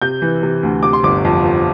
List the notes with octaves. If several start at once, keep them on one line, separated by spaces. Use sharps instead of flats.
C3 G6
E3
C3
D2
C3 D6
C6
G1 D6
F2
F3